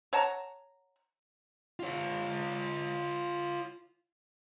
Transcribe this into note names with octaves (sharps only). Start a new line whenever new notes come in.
C#5 F#5 A5 A#5
F4 C#5